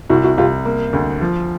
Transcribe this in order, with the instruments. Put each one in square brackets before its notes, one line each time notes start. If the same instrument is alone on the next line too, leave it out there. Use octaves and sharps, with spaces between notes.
[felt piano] C2 [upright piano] E4 F#4
[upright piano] E4 F#4
[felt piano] C2 [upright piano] F4 G4
[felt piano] A#3
D2
F3